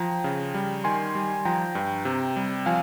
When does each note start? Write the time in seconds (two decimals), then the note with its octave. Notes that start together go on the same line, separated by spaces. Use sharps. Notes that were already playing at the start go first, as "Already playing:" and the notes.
Already playing: F3 G5 A#5
0.24 C#3
0.54 G3
0.84 D#3 G#5 C6
1.15 G3
1.45 F3 G5 A#5
1.75 G2
2.05 C3
2.36 G3
2.66 F3 F5 G#5